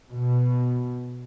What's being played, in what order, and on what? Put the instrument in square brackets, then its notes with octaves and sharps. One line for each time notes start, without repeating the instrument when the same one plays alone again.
[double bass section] B2